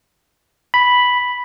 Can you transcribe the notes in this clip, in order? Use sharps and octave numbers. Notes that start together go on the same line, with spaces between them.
B5